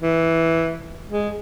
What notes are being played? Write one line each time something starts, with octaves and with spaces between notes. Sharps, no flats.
E3
G#3